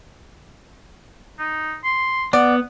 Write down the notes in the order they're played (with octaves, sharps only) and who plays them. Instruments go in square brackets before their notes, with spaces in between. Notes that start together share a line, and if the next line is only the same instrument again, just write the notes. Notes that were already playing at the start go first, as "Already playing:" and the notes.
[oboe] D#4
C6
[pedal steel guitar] B3 [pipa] D5 [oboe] F#5